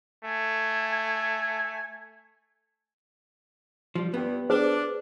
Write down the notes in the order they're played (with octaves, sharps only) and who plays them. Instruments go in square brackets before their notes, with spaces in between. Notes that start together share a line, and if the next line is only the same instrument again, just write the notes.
[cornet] A3 [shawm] G#5
[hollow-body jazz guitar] F3 G3
[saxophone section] G2 [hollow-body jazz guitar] B3
[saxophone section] D4 [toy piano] G#4 B4 C5